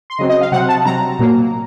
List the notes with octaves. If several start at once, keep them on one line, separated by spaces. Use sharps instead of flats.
C6
C#3 F#3 C4 D#5
D#5
F5
C3 F#3 C4 F#5
A5
C3 F#3 C4 A#5
A#2 F#3 A#3